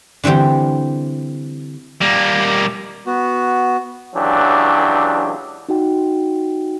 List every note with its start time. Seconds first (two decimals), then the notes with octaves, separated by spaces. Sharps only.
0.24 D3 E3 G3 C4 G4
2.01 G3 A#3
3.06 B3 F#4
4.14 C#2 E3 F#3 D4 G4
5.69 D#4 F#4 G5